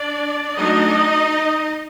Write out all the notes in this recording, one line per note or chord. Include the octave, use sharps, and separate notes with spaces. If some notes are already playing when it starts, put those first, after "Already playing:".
Already playing: D4 D5
F#3 A3 D4 D#4 D#5